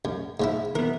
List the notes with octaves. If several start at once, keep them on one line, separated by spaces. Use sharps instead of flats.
F#2
G#2 F3 E4
E3 B3 A#4